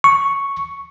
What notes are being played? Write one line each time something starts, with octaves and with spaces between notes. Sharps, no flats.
C#6